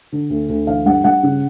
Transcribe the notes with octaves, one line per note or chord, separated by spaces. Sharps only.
D3
D2
D2
E3 F5
G2 F#5
G2 F#5
C#3